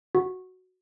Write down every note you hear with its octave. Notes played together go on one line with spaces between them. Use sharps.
F#4